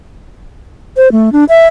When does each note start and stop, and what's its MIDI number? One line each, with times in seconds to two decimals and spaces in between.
0.97 1.11 72
1.12 1.30 57
1.33 1.44 62
1.49 1.67 76